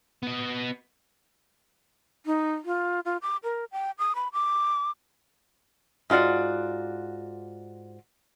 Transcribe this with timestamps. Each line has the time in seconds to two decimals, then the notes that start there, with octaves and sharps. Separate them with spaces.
0.23 B3 D#5
2.26 D#4
2.65 F4
3.05 F4
3.22 D6
3.44 A#4
3.72 G5
3.98 D#6
4.15 B5
4.33 D6
6.10 G#2 F4 F#4 D5 F#5